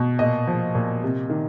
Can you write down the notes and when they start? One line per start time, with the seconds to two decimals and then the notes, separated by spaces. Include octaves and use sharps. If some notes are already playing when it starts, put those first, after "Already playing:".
Already playing: B2
0.19 A#2 D#5
0.47 F3
0.75 A#2
1.03 C3
1.30 D#3